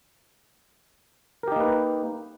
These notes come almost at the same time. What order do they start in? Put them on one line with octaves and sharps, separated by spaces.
A#4 G4 D#4 A#3 B4